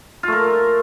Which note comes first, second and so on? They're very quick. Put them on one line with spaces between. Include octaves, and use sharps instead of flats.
F4 A3 A#4